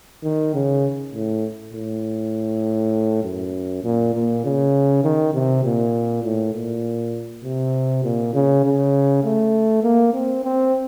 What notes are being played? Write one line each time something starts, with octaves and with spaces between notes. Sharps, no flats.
D#3
C#3
A2
A2
F#2
A#2
A#2
C#3
D#3
C3
A#2
A2
A#2
C3
A#2
C#3
C#3
A3
A#3
C4
C4